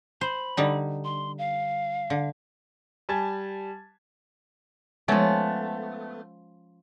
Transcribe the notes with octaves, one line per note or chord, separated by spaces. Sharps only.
C5 B5
D3 G3 D#4
C6
F5
D3
G3 G#5 A5 G#6 A6
F3 G#3 A3 B3 C#4